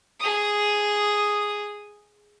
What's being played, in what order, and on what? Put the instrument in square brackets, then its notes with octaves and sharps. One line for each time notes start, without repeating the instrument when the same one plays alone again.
[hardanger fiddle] G#4 D#6